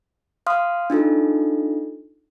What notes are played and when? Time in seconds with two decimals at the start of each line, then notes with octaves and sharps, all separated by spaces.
0.47 F5 C6 D#6 F6
0.90 D4 D#4 F4 A4